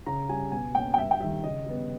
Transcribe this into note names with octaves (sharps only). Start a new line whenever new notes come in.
C#3 A#5
G3 C#4 G#5
B2 G#5
A#3 C#4 G5
G5
G2 E5
G5
D#3 G3 E5
C#3 D#5
G3 B3